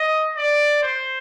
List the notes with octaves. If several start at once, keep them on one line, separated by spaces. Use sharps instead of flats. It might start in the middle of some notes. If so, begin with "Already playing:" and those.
Already playing: D#5
D5
C5